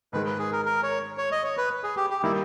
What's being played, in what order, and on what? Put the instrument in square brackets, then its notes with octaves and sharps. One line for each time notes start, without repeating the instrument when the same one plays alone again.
[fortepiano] G#2 D#3 G#3 [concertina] B4
[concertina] B4
G#4
A#4
A#4
C#5
C#5
D#5
C#5
B4
G#4
G4
G4
[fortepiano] D#3 G3 A#3 [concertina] E4